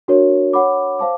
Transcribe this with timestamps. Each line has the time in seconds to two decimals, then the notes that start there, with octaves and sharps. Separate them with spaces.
0.08 D4 F#4 A#4 C#5
0.53 C#5 F#5 B5 D6
0.99 C5 F5 A5 D6